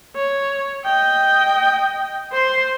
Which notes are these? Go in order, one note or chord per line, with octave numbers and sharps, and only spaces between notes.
C#5
D#5 G5
C5 C6